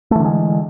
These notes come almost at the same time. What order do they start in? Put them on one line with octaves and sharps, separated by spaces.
A3 E3 D3 G#3